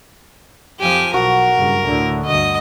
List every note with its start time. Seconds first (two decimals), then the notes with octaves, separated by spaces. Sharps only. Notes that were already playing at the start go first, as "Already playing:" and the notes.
0.80 F2 F3 G4 G#5
1.14 B1 F#4 A#4
1.54 F#1 G2
1.83 D2 A2 D3
2.26 D2 G2 D#5 D#6